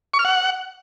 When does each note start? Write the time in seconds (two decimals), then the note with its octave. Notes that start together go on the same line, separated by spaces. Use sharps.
0.14 C#6
0.19 F6
0.25 F#5